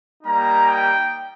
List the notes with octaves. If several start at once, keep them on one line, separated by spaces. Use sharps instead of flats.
G3 A#3 D#4 A#5
G5